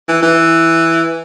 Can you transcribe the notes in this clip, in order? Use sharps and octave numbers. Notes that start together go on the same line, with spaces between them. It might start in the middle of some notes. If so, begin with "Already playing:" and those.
E3
E3